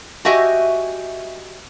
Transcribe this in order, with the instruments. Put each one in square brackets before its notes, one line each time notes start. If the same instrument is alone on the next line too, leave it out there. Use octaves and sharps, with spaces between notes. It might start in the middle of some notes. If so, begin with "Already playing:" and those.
[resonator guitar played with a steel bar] F#4 G4 D#5 E5 G#5